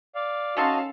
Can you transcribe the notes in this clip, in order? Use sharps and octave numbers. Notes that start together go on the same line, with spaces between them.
D5 F5
D#3 C#4 F#4 A4 D#5 F5 A5 C6